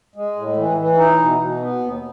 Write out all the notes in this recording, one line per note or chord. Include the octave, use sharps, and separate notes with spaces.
G#3
A2
E3
E3
D#4
B2
B2
B3
D#2